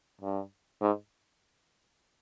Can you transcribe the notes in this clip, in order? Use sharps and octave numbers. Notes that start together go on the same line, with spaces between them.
G2
G#2